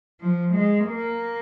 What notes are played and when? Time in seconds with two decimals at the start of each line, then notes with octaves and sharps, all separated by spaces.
0.21 F3
0.53 G#3
0.85 A#3